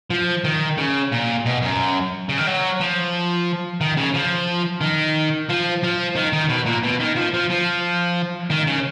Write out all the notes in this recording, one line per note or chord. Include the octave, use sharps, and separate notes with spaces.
F3
D#3
C#3
A#2
B2
F#2
C#3
D#3
F#3
F3
D#3
C#3
F3
D#3
F3
F3
D#3
D#3
B2
A#2
B2
D#3
F3
F3
F3
D#3
C#3